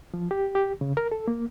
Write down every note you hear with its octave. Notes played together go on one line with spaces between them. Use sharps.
F3
G4
G4
C#3
A#4
A4
A#3